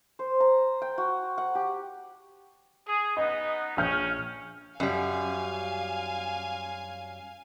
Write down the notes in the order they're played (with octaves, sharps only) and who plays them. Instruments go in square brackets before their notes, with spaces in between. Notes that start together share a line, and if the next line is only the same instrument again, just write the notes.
[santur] C5
A#5
G5
F#4
F#5
G4
[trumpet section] G#4
[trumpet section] B3 D#4 [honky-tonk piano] D#5
[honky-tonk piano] A#1 F6 G6 [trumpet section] C#4
[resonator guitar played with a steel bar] F#2 G3 [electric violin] F5 G#5